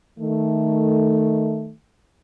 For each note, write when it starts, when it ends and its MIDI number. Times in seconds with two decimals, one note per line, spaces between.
0.19 1.73 51
0.19 1.73 57